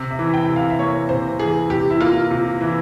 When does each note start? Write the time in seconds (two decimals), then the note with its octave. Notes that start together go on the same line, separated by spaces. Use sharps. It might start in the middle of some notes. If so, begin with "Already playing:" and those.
Already playing: C3
0.11 E5
0.19 E3
0.34 G5
0.50 C3
0.56 F5
0.70 E5
0.79 A#3 C#5
1.09 C3 C5
1.39 E3 G#4
1.70 C3 G4
1.90 E4
2.01 A#3 F4
2.30 C3 F4
2.61 E3 E4